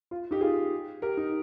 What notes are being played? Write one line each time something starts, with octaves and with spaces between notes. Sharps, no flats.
F4
D#4 G4
F4 G#4
G4 A#4
D#4